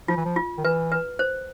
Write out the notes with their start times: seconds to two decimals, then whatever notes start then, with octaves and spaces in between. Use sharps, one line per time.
0.08 F3 F4
0.17 E3
0.25 F3
0.36 F4
0.58 D#3
0.65 E3 B4
0.92 B4
1.19 C5